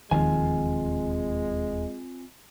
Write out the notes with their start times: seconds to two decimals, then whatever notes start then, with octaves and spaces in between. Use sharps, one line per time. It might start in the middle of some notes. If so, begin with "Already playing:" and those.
0.11 E1 D#2 D#3 F3 G#3 C4 F4 G#5